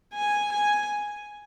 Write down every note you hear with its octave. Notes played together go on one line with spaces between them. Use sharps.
G#5
G#5